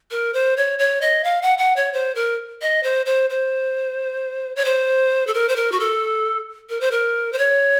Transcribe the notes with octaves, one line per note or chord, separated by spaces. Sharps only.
A#4
C5
C#5
C#5
D#5
F5
F#5
F#5
C#5
C5
A#4
D#5
C5
C5
C5
C#5
C5
A4
A#4
C5
A#4
F#4
A4
A#4
C5
A#4
C5
C#5